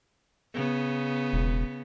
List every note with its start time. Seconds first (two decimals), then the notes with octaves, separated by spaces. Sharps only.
0.54 C#3 B3
1.33 E1